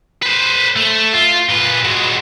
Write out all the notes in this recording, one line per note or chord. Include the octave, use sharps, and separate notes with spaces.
B4 C5
A3
F4
A#2 B4
F#3 G#3